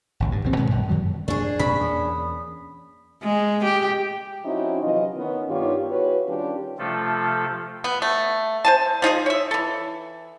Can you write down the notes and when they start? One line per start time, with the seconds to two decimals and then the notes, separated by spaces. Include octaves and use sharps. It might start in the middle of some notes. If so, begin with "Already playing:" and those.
0.20 A1 D#2 G#2
0.32 G2
0.44 A#1 A#2 E3 C4
0.57 A#2 D#3 G#3 B3
0.71 F#2
0.89 F#2 D#3 F#3 G3
1.28 F2 D4 G#4 C#6
1.60 A#2 G#3 B5
1.80 E2 A#3 C#4 D#6
3.24 G#3
3.64 G4
4.44 F3 C4 C#4 D#4 E4 F#4
4.81 C3 E3 F#3 F4 D#5
5.15 D#3 B3 C#4
5.49 G2 D#3 B3 F4 G4 C#5
5.89 E4 F#4 G#4 B4 C#5
6.27 D#3 G3 C#4 D4 F4 G4
6.78 C3 F3 A3 F4 A4
7.84 B3
8.02 A3
8.65 C5 G#5 A5
9.02 F3 D#4 F4 G#4
9.26 C#5 E5
9.51 E3 A4